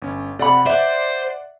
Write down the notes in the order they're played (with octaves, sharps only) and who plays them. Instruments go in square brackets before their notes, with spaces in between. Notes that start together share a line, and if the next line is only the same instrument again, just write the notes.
[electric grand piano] G1 C#4
[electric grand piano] C3 [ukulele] D5 F#5 B5
[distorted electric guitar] C5 [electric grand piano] D5 F#5 [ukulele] E5